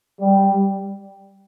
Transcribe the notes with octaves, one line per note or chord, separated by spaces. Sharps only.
G3